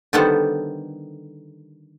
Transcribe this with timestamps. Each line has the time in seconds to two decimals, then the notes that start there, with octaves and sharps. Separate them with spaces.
0.13 D3 D#3 G3 B3 A4 C5